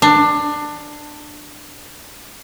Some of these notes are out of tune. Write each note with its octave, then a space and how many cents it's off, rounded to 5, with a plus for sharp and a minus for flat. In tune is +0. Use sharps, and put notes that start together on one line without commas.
D4 +20